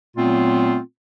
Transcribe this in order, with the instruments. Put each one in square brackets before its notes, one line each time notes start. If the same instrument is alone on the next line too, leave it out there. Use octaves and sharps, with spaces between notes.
[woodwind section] A#2 F#3 A3 B3 C4 F4